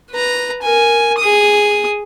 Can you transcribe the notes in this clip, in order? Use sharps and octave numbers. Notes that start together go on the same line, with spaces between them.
B4 A#5
A#4 G#5
G#4 D#6